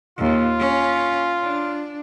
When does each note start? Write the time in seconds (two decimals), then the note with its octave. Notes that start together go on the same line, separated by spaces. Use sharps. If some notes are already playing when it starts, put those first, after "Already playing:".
0.18 D#2 F4
0.60 C#4
1.42 D4